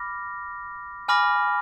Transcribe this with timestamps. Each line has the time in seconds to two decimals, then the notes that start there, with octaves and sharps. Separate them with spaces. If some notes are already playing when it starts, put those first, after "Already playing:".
Already playing: B5 D6 F6 A#6
1.08 G#5 B5 D6 F6 A#6